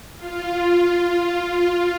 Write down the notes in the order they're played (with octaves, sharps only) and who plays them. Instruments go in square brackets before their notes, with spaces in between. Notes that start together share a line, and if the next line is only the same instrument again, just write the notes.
[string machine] F4